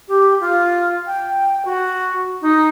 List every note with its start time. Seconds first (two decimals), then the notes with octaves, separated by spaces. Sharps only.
0.08 G4
0.40 F4
1.06 G5
1.65 F#4
2.42 D#4